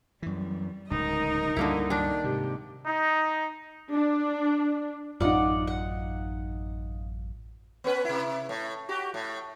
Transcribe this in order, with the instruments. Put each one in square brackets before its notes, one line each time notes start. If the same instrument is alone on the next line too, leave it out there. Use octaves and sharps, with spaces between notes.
[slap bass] F#2 E3 [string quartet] G3
[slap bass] D1 C#2 [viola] D#4 [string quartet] A#4 D#5
[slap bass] C#2 G2 G3 [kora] D3 A#3 E4
[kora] D#3 D4 [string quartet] D5
[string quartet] G#2 [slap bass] C3 [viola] G4
[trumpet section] D#4
[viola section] D4
[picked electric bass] A1 F#2 [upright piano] D#4 F4 [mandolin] D5 F#5
[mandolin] F#5
[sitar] B3 C#4 B4
C3 E4
A2
F#4 G4
A2